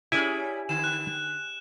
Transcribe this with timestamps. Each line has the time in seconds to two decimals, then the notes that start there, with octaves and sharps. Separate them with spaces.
0.12 G3 C#4 E4 G#4 G#5
0.69 D3 E7
0.84 F#6